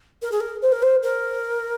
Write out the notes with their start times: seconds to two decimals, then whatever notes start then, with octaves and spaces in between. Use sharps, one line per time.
0.22 A#4
0.32 G#4
0.40 A#4
0.62 C5
0.72 A#4
0.82 C5
1.03 A#4